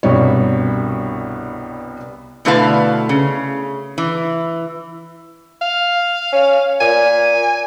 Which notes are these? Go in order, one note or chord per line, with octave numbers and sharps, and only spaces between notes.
C2 G2 B2 G3 C#5
B2 D3 A3 E4 B4 F5
C#3
E3
F5
C#4
A#2 G#5